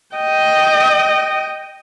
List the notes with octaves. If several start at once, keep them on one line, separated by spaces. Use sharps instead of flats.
D#5 G5